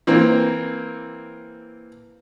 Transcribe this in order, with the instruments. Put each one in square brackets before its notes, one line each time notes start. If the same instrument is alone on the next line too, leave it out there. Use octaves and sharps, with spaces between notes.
[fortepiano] E3 A#3 C4